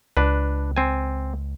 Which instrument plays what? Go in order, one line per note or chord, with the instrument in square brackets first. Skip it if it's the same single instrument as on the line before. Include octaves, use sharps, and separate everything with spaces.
[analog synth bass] C#2 [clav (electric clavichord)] D4 B4
[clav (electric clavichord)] C4 G#5